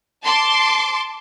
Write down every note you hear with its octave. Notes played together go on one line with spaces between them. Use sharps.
A5 C6 D6